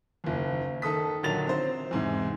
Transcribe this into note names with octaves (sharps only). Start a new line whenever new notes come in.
F#1 D#2
D#3 A4 D#6 B6
A#1 D3 D#3 F#3 A6 F7
C4 C5
E2 G#2 C3